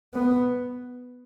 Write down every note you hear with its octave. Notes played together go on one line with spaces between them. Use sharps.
B3